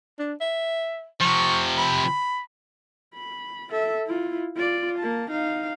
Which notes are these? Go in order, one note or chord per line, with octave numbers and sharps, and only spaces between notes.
D4
E5
C3 F3 C#6
B5
B5
A4 E5
E4 F4
F4 D5
A#3 A5
D#4 F5